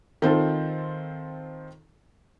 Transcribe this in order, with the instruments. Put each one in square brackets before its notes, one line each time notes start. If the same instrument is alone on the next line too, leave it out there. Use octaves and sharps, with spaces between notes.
[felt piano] D#3 C4 F4 A4